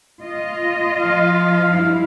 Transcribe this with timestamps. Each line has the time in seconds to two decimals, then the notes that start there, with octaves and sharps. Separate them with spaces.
0.22 F4 D#5
1.02 F3 F5
1.71 G2 E4